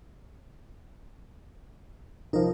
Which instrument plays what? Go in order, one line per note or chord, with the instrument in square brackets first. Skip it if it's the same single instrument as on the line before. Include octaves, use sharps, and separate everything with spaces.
[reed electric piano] C2 F3 [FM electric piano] D#4 A#4